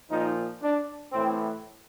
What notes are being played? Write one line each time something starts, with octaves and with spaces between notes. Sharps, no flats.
A#2 F3 D#4
D4
A2 E3 C4